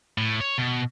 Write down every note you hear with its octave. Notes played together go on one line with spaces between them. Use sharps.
A2
C#5
B2